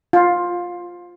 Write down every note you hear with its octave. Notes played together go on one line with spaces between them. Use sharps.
F4